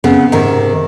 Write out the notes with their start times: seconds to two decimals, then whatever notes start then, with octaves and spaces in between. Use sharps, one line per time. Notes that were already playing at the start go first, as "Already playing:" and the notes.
0.04 C#3 B3 C4
0.32 G#2 C3 D#3